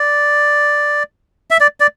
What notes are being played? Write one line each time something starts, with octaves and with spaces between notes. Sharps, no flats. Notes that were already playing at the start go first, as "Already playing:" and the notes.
Already playing: D5
E5
D5
D5